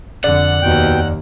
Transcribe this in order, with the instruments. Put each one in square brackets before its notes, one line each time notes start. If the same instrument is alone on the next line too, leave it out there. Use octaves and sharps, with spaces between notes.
[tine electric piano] F2 D5 [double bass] D3 [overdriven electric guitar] F#5
[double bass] D#2 [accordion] B2 G5